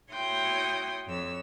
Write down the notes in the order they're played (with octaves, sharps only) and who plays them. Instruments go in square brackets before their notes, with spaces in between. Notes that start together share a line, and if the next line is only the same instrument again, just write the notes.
[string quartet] E4 F#4 C#5 G5 C6 D#6
F2 C#5 E6